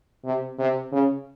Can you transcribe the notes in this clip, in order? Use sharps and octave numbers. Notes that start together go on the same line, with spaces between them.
C3
C3
C#3